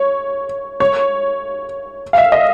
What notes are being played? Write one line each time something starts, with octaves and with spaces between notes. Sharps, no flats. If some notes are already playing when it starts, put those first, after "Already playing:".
Already playing: C#5
C#5
F5
E5
D#5